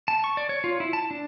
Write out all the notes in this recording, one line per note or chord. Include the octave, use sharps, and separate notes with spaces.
A5
C#6
D5
C#5
F4
E4
A5
D4